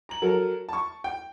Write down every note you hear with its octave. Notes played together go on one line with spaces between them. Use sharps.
A#5 F#7
F#3 A4 A#4
A5 C#6
G5